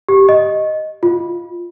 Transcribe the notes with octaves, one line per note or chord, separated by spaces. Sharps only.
G4
D#5
F4